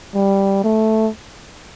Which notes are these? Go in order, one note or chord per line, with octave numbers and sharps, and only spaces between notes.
G3
A3